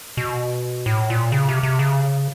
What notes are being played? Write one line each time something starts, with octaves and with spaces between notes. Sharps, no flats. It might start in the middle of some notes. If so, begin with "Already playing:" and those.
B2
A2
A#2
C#3
C3
C3
C#3